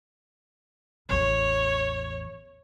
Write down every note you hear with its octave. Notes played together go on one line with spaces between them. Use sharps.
A1 E2 C#5